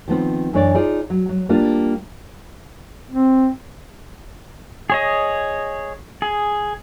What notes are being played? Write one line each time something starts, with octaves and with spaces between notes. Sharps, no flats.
D#3 F3 B3 C4
F#2 E3 D4 C#5 D5
D#4 F4 G#4 D5
F#3
F#3
G3 A#3 D4 F4
C4
G#4 C#5 D#5
G#4